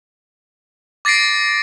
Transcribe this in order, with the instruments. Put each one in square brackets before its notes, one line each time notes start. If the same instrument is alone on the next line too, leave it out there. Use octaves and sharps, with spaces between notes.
[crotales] D6 A6 A#6 C7 D7